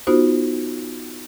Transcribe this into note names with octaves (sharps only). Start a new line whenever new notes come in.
B3 D#4 F4 F#4 C5